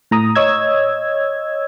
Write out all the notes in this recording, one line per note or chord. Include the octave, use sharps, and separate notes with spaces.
A2 A#5 D#6
C#5 D#5 E6 G#6